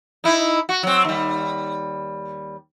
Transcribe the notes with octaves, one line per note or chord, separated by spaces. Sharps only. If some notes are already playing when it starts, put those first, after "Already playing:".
D#4 E4
F#4
F#3 C4
D#2 G3